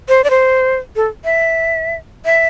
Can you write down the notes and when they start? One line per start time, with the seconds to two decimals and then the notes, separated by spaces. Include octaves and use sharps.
0.09 C5
0.24 D5
0.30 C5
0.96 A4
1.25 E5
2.25 E5